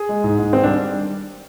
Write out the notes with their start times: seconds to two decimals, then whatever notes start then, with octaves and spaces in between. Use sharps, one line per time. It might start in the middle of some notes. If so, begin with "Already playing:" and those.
Already playing: G#4
0.09 G#3
0.24 G#2
0.39 G#2
0.53 D#3 C4
0.63 G3 D4